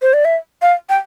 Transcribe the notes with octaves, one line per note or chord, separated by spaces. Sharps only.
C5
D5
E5
F5
G5